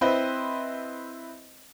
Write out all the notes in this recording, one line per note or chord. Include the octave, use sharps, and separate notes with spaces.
C4 E4 B4 C5 D#5